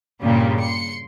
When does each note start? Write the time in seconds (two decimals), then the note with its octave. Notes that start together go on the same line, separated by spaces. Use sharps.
0.23 G2 A#2 C#3 G3
0.61 C6 C#7